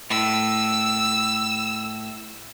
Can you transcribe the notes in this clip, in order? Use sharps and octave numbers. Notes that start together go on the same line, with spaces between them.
A2 E6